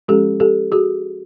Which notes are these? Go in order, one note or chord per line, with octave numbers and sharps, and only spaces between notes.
F3 G#3 C#4 G4 A4
G4 A4
F#4 G#4